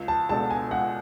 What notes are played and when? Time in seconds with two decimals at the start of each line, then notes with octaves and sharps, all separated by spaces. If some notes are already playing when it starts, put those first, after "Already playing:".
Already playing: C#2
0.08 A5
0.29 B2 G#3 D4 A4 A5
0.50 G#5
0.71 C#2 F#5